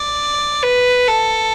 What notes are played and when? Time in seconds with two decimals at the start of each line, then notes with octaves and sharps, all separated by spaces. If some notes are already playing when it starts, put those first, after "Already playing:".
Already playing: D5
0.63 B4
1.07 A4